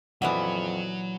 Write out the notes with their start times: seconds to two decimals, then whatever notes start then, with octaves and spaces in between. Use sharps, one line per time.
0.22 F2 A#2 E3 F#3 B3 F#4 F#5